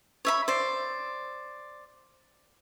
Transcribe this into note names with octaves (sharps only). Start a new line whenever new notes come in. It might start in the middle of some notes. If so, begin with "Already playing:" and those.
C#5 E5 B5
C5 D5